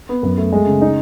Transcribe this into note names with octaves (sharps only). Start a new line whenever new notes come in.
B3
F#2
A3
G#3
C#3
D#4